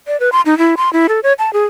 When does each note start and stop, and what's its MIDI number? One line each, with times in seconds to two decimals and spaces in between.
0.07 0.19 74
0.20 0.30 71
0.32 0.41 84
0.46 0.58 63
0.58 0.75 64
0.77 0.92 84
0.93 1.07 64
1.09 1.20 69
1.23 1.33 73
1.39 1.53 81
1.53 1.66 68